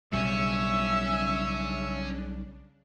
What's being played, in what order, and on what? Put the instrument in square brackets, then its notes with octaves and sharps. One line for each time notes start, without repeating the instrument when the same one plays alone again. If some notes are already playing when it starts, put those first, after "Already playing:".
[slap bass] B1 G3 [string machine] C#3 D4 [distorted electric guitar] C#4 [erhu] E5